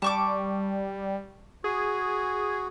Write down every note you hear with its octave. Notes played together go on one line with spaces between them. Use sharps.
G3 A5 C#6 D6
F#4 G#4